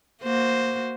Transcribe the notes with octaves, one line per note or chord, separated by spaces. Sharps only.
A#3 F#4 C5